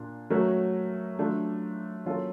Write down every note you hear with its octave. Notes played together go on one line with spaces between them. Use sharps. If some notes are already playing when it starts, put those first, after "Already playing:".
Already playing: A#2 A#3 D4
F#3 A3 C#4 F#4 A#4
F#3 A3 D4 F4
F#3 A#3 C#4 F4 A4